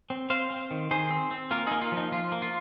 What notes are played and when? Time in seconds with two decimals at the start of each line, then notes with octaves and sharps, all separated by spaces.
0.10 C4
0.30 C4 C5 F5
0.51 C4
0.71 D#3
0.91 D#3 G#4 C5
1.10 C4
1.31 C4
1.51 A#3 F4 A#4
1.67 A#3 D#4 G#4
1.82 F4
1.92 F3
1.97 D#4
2.12 F3 F4
2.32 A#3
2.42 F4